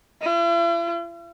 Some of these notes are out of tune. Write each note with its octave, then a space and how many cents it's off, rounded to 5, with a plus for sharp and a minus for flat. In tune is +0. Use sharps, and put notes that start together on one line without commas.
E4 +45